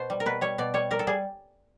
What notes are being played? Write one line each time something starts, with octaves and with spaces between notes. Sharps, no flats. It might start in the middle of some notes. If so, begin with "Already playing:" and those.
Already playing: B2 C5
G3
A#4
B2 B4
G3 C#5
B2 D5
G3 C#5
G3 A#4
A4
G3 G#4